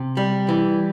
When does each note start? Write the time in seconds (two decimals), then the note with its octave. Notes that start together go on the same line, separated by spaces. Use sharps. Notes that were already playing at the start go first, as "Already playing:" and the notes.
Already playing: C3
0.17 G3
0.49 E3